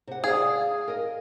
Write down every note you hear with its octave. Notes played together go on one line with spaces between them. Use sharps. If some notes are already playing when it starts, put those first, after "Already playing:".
C3 F#5
G#4 D5 F5
A#4 D#5